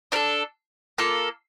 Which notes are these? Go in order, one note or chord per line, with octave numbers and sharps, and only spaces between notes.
D4 A4 A#4
A#3 F4 A4